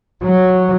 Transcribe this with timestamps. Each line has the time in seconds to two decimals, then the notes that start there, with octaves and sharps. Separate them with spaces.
0.22 F#3